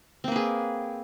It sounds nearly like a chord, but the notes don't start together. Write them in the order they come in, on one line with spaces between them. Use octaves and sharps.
C4 A#3 B4 G#4